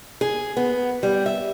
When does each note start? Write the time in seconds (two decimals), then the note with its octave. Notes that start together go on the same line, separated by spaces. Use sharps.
0.21 G#4
0.57 B3
1.03 G3
1.26 E5